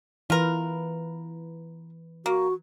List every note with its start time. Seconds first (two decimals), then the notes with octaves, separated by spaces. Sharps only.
0.30 E3 F4 A#4 B4
2.26 A#3 F#4